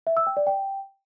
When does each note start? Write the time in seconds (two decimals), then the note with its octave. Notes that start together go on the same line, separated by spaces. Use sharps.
0.07 E5
0.17 E6
0.27 G5
0.37 D5
0.47 G5